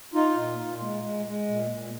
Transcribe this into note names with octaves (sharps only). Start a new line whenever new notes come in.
D#4 F4
A#2
A#2
G#3
G#3
G#3
A#2
A#2